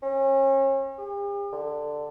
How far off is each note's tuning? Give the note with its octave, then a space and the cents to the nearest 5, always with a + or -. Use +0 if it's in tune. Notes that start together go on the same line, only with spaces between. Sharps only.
C#4 -35
G4 +45
D3 +15